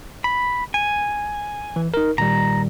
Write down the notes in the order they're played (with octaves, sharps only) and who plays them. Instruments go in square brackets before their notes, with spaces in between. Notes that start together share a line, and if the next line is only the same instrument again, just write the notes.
[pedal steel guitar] B5
G#5
[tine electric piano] E3
D#4 A#4
[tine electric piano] A#2 D#3 G3 [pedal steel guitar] A#5